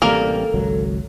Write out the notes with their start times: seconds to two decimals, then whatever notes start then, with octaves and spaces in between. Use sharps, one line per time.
0.02 A1 C3 G3 A#3 A4 A#4
0.54 G#1 C#2 F#3